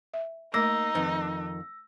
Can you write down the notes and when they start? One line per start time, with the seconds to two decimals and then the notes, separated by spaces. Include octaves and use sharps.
0.14 E5
0.54 A3 A#3 D#4 A#4 D6 E6 A#6
0.95 F2 D#3 B4